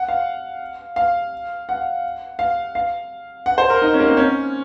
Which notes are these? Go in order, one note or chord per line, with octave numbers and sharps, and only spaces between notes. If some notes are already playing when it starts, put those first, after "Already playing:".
Already playing: F#5
F5
F5
F#5
F5
F5
F#5
C5
A#4
D#4
C#4
A#3
C4
C#4